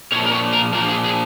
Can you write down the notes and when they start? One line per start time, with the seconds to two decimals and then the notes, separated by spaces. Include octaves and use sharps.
0.12 A#2 F3 C#5
0.25 A#4
0.32 C#5
0.53 A#4
0.73 A#2 A#4
0.76 F3
0.89 G#4
1.04 G#4